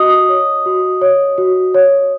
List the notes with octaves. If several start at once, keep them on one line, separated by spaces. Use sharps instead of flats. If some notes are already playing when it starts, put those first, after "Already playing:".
Already playing: F#4 D#5 D#6
C#5
F#4
C#5
F#4
C#5